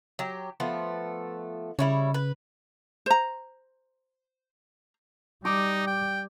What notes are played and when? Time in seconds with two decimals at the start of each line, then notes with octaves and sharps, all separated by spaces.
0.19 F#3 G4
0.60 F3 A3 B3
1.79 C#3 G3 E4 C#5
2.14 B4
3.06 C5 A#5
5.45 G3 D#4 D6
5.87 G5